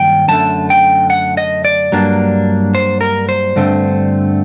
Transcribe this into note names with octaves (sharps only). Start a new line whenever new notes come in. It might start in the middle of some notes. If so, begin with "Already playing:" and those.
Already playing: G2 D#3 F#3 A#3 G5
F#2 D3 A3 A5
G5
F#5
D#5
D5
G2 F#3 A#3 D4
C5
A#4
C5
G2 D3 A3 C4